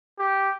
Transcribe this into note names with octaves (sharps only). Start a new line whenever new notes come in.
G4